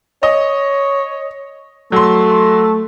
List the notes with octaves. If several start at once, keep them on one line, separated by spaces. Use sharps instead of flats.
C#5 D#5
F#3 A3 C6